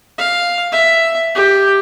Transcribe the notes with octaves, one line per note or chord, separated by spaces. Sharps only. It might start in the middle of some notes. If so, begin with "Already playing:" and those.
F5
E5
G4